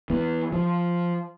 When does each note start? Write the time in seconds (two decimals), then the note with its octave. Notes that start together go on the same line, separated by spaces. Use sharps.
0.10 E3 B3
0.53 F3